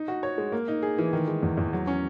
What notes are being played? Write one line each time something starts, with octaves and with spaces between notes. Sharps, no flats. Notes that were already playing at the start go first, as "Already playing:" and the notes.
Already playing: D#4
F#4
C#5
G#3
A#3
D#4
G#4
E3
D#3
G#3
E2
E2
F#3
C#4